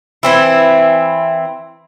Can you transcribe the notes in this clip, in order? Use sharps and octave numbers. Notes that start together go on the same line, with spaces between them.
E3 C4 E4